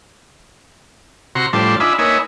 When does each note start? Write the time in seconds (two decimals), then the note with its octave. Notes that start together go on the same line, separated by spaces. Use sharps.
1.35 C3 F#4 A#5 C6 C#6
1.53 A2 F3 G3 D4 C5 A5
1.80 D4 D#4 F4 E5 G#5 B5
1.99 A#3 D#4 B4 C#5 E5 G#5